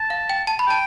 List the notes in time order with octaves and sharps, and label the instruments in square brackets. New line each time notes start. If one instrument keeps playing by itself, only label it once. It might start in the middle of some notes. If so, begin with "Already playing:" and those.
Already playing: [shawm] A5
[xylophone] F5
G5
A5
B5
[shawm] G5 [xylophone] A5